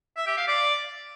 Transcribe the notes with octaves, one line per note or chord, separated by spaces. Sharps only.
E5
G4
F5
D5